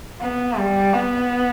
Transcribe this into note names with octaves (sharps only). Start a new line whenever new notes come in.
B3
G3
B3